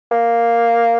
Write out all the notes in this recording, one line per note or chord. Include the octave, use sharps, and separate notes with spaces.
A#3